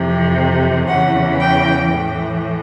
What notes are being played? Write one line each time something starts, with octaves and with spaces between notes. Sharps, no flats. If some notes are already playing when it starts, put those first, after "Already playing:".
Already playing: F2 C3 E3
E2 C#3 E3 F#5
G5
A2 E3